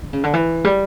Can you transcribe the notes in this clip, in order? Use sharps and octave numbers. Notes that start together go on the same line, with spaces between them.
D3
C#3
D3
E3
G3